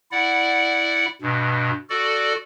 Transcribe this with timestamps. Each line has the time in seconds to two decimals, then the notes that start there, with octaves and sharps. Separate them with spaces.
0.12 E4 D5 F#5
1.22 G2 B2
1.90 F#4 A4 D5